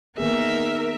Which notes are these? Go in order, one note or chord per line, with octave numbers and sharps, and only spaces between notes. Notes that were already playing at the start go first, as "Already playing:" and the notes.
D#3 A#3 B3 D#4 G#4 A#4 E5